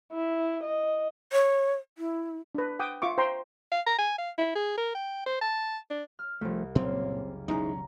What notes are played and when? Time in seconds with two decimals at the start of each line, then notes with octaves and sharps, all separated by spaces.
0.12 E4
0.63 D#5
1.32 C#5
1.98 E4
2.55 D4 B4
2.79 F#5 G5 D6 D#6
3.02 F4 E5 C#6 D6
3.18 C5 G5 A#5 C6
3.72 F5
3.86 A#5
3.98 G#5
4.18 F5
4.38 E4
4.55 G#4
4.77 A#4
4.95 G5
5.26 C5
5.41 A5
5.90 D4
6.19 F6
6.41 C2 F3 A3
6.75 F#1 C#2 A#2 A#3 C4 C5
7.48 E1 F#3 C#4 D#4 E4 G#4 A#5